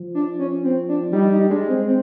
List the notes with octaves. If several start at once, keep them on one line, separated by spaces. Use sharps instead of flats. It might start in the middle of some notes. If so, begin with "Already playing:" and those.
Already playing: F3
D4
C#4
C4
D4
G3 D#4
D#4
G#3 D4
C4
C4